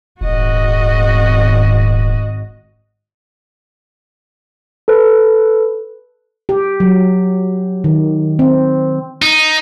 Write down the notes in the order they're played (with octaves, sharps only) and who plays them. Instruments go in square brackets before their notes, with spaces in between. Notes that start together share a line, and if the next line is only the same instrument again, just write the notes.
[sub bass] D#1 [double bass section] G#1 [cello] F#4 D#5
[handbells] A4 B4
[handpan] G4
F#3
D#3
C4
[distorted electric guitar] D#4